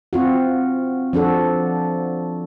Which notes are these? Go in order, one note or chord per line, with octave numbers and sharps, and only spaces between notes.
C4 F4 F#4
F3 D4 F#4 A4